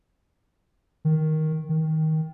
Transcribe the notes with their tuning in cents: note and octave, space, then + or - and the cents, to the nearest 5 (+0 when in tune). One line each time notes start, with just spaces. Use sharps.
D#3 +5
D#3 +20